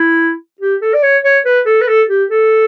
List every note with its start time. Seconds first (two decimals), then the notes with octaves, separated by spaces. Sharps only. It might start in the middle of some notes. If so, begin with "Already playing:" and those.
Already playing: E4
0.60 G4
0.82 A4
0.94 D5
1.03 C#5
1.24 C#5
1.45 B4
1.66 A4
1.81 B4
1.87 A4
2.09 G4
2.30 A4